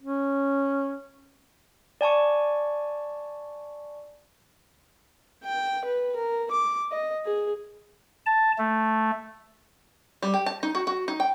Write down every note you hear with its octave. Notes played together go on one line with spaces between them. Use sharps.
C#4
D5 G#5 A5 C#6
G5
B4
A#4
D6
D#5
G#4
A5
A3
G3
G4
A5
D#4
F#4
F#4
D#4
G5